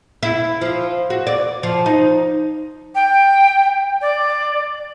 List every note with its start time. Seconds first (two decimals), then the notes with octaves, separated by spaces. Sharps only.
0.23 E4
0.61 F3
1.10 F#4
1.27 D5
1.63 F3
1.86 D#4
2.95 G5
4.01 D5